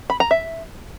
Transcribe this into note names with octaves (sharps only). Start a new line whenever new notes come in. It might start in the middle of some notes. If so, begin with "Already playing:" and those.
B5
A#5
E5